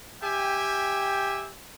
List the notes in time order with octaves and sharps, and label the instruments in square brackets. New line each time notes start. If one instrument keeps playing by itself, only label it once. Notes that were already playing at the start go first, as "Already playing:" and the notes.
[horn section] G4 E5 G5 G#5